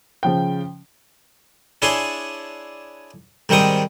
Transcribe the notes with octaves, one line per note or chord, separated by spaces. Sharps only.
C#3 F3 G5
D4 E4 G#4 C#5 G#5 C6
G#2 D#3 G3 C4 C#6 D#6